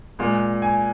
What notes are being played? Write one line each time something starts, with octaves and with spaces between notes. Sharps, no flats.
A#2 G#3
G#5